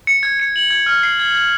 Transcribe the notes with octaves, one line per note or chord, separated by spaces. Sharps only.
C#7
G#6
C#7
F#7
G#6
F6
C7
G#6
G#6